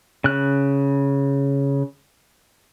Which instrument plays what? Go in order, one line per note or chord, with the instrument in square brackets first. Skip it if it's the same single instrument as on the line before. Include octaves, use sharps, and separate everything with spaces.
[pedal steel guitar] C#3 F#6